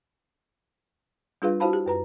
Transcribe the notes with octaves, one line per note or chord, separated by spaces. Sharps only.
G3 D4 F4 G#4 B4 F5
E4 F#4 C5 F5 A5 B5
G4
F#2 B4 A#5